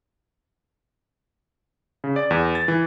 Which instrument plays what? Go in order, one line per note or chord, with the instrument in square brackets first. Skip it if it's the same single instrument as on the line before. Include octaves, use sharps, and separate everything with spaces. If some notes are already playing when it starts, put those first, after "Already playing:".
[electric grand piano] C#3
D5
E2
A6
E3